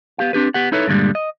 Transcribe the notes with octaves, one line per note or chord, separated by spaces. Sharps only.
B3 G4 F5
C4 D4 G4 B4
B3 G4 F#5
D#4 E4 A4 B4 C#5
G2 A#2 D3 E3 G3 G#3
D#5